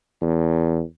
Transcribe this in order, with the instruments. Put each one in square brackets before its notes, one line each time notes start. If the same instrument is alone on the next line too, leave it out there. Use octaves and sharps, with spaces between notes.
[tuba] E2